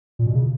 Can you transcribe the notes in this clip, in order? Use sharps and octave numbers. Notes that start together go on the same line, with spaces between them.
A#2
B2
C#3